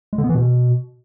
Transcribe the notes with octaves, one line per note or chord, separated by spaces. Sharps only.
G#3
D3
B3
E3
B2